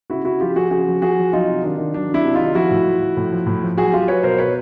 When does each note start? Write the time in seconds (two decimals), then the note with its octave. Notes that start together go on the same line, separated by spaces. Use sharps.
0.10 C#3 E4 F#4
0.25 C#3 E4 F#4
0.40 F3 F4 G4
0.56 F3 F#4 G#4
0.71 C#3 F#4 G#4
0.87 F3
1.01 F3 F#4 G#4
1.18 F3
1.32 F#3 D#4 F4
1.47 C3
1.63 D#3 D4
1.78 D#3
1.93 F#3 D4
2.09 F#3
2.14 D4 E4
2.25 C3
2.34 D#4 F4
2.40 D#3
2.55 F3 E4 F#4
2.71 A2
2.86 F3
3.01 F3
3.17 A2
3.32 F3
3.46 A2
3.63 F3
3.77 F#3 F#4 G#4
3.92 F#3 F4 G4
4.08 F#3 B4 C#5
4.23 B2 A#4 C5
4.38 B2 B4 C#5